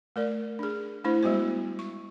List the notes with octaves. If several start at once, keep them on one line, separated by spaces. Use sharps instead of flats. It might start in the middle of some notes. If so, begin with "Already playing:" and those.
A3 A#4 D5
D4 G#4
A3 D4 E4 C5
G3 G#3 B3 F#4 C5
C#6